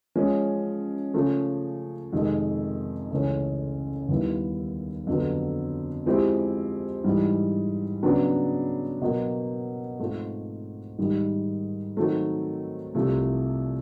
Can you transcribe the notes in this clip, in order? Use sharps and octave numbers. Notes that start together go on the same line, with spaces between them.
F3 G#3 C#4
C#3 F3 A3 C#4
F2 C3 D#3 G#3
C#2 C#3 E3 A3 C#4
D#2 D#3 G3 B3 E4
F2 D3 F#3 B3
F3 G#3 C4 E4 G4
G#2 E3 G3
C#3 F#3 B3 D4
B2 F#3 A#3
G#2 F3 A3 C4 F4
G#2 D#3 G3
D#3 F#3 A3 C4
C2 C3 F3 A3